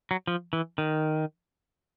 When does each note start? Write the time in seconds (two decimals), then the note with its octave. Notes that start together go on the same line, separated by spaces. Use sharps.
0.11 F#3
0.27 F3
0.53 E3
0.78 D#3